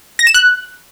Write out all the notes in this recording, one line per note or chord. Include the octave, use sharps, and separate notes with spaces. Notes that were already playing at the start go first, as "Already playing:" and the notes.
A#6
E7
F#6